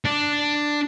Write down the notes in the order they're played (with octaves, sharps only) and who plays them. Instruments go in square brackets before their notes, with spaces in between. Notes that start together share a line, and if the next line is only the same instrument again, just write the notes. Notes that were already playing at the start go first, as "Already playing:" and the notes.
[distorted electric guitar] D4